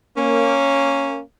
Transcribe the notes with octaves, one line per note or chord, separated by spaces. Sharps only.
A#3 C#4